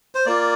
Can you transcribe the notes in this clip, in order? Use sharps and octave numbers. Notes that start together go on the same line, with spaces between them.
C5
A#3 F4 D5